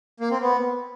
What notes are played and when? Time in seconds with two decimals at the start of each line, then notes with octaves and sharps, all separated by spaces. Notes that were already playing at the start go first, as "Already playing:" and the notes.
0.20 A#3
0.31 C4
0.42 B3